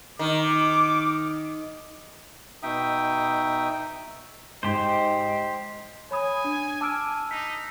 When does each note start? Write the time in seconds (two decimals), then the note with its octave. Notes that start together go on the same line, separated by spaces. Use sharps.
0.19 D#3 D6
2.63 B2 D#4 E5 G5 D#6
4.63 G#2 G4 C5 D#5
6.11 C#5 G#5 B5 D#6
6.44 D4
6.81 A5 D6 E6 F6 D7
7.31 D#4 B6